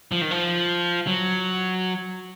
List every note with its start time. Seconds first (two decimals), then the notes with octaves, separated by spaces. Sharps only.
0.12 F3
0.21 D#3
0.31 F3
1.07 F#3